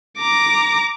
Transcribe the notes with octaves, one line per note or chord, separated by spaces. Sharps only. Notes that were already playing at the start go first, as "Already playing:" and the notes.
A#5 D6